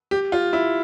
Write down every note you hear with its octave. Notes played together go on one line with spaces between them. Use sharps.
G4
F4
E4